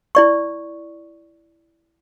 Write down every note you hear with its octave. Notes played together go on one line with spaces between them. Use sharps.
E4 D5 C#6